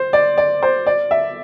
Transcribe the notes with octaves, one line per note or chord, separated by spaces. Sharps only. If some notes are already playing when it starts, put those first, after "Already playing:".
Already playing: C5
D5
D5
C5
D5
E5